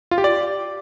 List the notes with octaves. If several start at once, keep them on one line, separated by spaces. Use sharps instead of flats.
F4
G4
D5